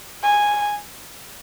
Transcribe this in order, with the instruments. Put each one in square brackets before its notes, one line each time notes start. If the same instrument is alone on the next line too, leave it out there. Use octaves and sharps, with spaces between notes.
[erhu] G#5